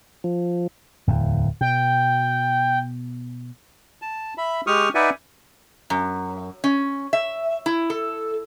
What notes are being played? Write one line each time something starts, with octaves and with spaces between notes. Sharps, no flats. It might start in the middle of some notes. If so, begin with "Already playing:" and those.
F3
D1 E2
B2 G5
A5
E5 B5
G#3 G4 C#6 D#6 F6
D#4 B4 D5 E5 F#5 G#5
F#2
C#4
E5
E4
A4